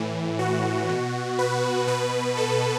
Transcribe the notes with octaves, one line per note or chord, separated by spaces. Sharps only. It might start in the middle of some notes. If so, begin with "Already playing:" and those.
Already playing: A2 E3
F#4
B2
B4
B2 B4
A4